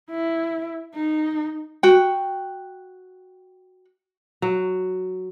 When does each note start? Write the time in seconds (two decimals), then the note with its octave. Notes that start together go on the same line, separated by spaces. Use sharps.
0.10 E4
0.95 D#4
1.83 F#4 G5
4.42 F#3